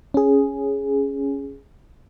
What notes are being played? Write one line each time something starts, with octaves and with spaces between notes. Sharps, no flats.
C#4 G#4